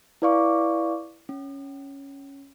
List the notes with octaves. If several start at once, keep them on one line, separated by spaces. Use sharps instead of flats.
E4 B4 D5 F5 C#6 D6
C#4